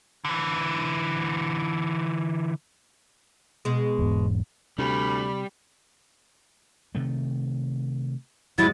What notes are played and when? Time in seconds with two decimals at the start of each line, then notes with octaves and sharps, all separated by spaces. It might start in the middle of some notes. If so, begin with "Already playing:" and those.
0.25 D3 E3
3.65 B2 G#3
3.99 E1 G#2
4.78 D2 C3 G3 B5
6.95 C3 D#3 A3
8.58 E2 G#2 F#3 G#3 E4 A6